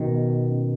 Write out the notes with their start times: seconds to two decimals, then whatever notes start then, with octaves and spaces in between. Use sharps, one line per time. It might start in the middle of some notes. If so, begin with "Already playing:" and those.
Already playing: B2 D#3 B3
0.49 C#4